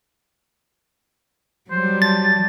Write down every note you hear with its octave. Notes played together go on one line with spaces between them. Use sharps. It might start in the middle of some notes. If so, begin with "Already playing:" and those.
F#3 G3 C5
A5 A6